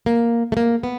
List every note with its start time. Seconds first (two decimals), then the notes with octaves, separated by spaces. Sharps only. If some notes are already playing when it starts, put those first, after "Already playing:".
0.06 A#3
0.52 A3
0.57 A#3
0.83 B3